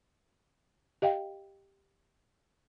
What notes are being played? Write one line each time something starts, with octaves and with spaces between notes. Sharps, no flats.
G4 D#5 F5 G5